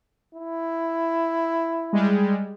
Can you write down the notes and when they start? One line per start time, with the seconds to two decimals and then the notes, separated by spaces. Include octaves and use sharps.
0.35 E4
1.93 G3 G#3